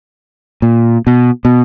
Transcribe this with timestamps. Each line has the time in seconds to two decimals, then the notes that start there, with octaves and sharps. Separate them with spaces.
0.62 A#2
1.07 B2
1.45 B2